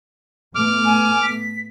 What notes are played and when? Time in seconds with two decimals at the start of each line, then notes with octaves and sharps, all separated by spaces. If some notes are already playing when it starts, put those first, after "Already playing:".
0.55 A2 A3 B3 D6 F6
0.85 G#5
1.22 B6